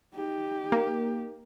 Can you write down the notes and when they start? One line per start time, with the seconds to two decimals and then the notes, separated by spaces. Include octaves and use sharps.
0.15 D#4 G4
0.72 A#3